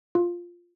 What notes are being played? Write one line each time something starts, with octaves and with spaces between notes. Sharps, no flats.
F4